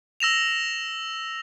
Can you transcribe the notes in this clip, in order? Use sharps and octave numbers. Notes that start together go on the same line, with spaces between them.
E6 A#6 E7 F7